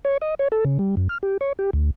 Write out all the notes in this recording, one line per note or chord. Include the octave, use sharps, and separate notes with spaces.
C#5
D#5
C#5
A4
C#3
G3
F#2
F6
G4
C#5
G4
D2